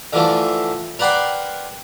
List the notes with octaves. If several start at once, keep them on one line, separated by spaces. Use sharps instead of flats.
D3 E3 F3 A3
A#4 B4 D5 F#5 G5 C6